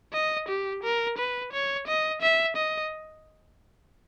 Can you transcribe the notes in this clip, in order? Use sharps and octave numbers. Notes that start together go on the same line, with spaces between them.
D#5
G4
A#4
B4
C#5
D#5
E5
D#5